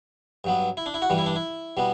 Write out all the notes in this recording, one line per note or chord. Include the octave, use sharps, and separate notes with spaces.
G2 F#3 B3
E4
D4
E4
F#4
G2 E3 G3
E4
D4
E4
B2 G3 B3